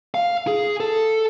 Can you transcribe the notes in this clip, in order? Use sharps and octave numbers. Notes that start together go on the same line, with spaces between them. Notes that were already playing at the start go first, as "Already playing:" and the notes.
F5
G#4
A4